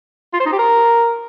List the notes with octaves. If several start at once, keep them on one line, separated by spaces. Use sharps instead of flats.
F4
C5
D#4
G4
A#4